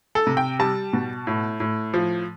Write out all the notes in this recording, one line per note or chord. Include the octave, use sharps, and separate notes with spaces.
A4
C3
G5
G3 A5
B2
A2
A2
F3